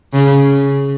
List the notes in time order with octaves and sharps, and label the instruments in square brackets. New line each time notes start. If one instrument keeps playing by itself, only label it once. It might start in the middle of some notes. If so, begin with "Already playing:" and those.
[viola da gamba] C#3